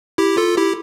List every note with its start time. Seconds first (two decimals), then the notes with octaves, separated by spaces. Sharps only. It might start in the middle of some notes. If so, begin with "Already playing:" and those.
0.18 E4 G4
0.37 F4 A4
0.57 E4 G4